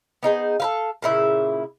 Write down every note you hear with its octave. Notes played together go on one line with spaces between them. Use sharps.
B3 D#4 G#4 C5
A4 B4 F5
A#2 C#3 E4